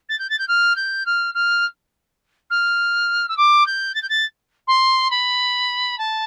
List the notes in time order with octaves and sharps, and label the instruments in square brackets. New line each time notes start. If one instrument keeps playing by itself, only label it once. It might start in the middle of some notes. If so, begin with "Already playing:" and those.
[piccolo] A6
G6
A6
G6
F6
G6
F6
F6
F6
E6
D6
G6
A6
G6
A6
C6
B5
A5